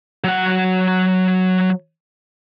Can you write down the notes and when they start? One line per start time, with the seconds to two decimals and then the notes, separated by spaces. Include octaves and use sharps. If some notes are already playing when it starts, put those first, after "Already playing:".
0.24 F#3 F#5